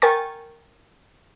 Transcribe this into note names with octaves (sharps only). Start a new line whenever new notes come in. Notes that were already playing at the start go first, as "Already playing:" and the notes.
A#4 G5 G#5 C#6 A6